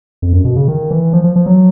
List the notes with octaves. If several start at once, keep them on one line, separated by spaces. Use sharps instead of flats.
F2
F#2
B2
C#3
D#3
E3
F3
F3
F3
F#3